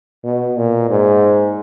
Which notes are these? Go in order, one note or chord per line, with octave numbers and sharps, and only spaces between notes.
B2
A#2
G#2